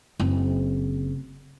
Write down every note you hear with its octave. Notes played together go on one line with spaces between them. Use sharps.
F#1 C4